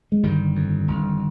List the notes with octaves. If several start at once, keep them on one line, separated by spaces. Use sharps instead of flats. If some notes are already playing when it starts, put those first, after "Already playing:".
G#3
G1 D#3 G3
F2
G1